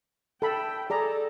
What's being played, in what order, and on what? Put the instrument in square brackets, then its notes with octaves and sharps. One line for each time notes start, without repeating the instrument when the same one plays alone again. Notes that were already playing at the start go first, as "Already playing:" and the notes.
[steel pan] A4 B5 [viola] G5
[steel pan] G#4 D5 A#5 [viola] A4